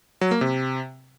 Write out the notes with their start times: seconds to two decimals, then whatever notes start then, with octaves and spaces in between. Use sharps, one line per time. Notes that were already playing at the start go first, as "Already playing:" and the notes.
0.21 F#3
0.31 A#3
0.41 C3